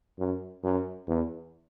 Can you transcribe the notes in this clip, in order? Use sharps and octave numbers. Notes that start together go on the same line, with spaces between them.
F#2
F#2
E2